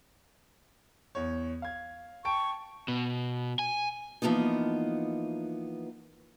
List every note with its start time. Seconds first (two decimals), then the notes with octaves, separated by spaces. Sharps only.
1.15 E2 C#5
1.62 F5 G#6
2.25 G5 A5 C#6 D7
2.88 B2
3.59 G#5
4.22 E3 F3 A#3 B3 D#4